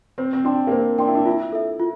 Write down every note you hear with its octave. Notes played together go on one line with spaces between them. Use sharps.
C4 C5
C4
D4 G5 C6
A#3
C4 C5
D4 G5 C6
E4
D4
E4 F4
A4 E5
F4